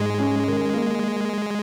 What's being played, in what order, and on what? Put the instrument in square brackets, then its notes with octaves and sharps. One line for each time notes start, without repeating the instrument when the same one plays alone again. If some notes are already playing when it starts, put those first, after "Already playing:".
Already playing: [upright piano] G#2 [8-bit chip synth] G#3
[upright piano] C#4
D#3
A#3